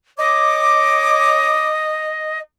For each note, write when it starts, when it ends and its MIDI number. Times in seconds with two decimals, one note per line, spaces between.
0.18 1.69 73
0.18 2.38 75
0.18 1.69 86